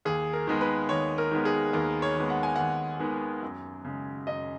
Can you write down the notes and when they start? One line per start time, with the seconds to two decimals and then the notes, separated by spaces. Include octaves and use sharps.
0.05 D#2 G#4
0.33 A#4
0.47 D#3 G#3 B3
0.61 B4
0.89 D#2 C#5
1.18 A#4
1.31 D#3 G#3 B3
1.45 G#4
1.73 D#2 A#4
2.02 C#5
2.15 D#3 G#3 B3
2.30 F#5
2.43 G#5
2.56 D#2 F#5
2.99 D#3 G#3 B3
3.43 F#2
3.85 C#3 G#3
4.27 F#2 D#5